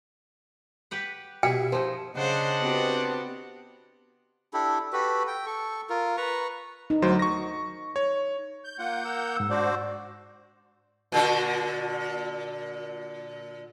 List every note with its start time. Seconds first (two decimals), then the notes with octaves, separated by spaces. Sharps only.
0.91 G4 B4 F#5
1.43 B2 E4 G4 G#4 G5
1.72 F3 D#4 C5
2.16 C#3 D4 C5 D#5 F#5
2.61 B3 C4 F#4 G4
4.54 D4 E4 G4 A4
4.93 F#4 G4 A4 B4
5.28 G5
5.46 A4 C#6
5.90 F4 A#4
6.17 B4 A#5 C#6
6.90 D#4
7.02 D2 F#3 C5
7.19 C#6 A#6
7.96 C#5
8.64 G6
8.79 A#3 F4 F#5 G6
9.05 A#4 E6
9.37 G#2 E6
9.50 D4 F#4 C5 D5
11.12 A#2 D3 F#4